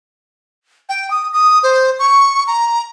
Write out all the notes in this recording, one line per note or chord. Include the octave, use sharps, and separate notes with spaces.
G5
D#6
D#6
C5
C#6
A#5